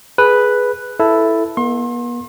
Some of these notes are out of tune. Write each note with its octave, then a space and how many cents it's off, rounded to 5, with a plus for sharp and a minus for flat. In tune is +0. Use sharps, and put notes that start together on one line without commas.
G#4 +10 B4 +0
E4 +5 A4 +0
B3 -45 C6 +35